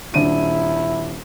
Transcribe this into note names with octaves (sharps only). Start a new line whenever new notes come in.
D#1 D4 E4 D#7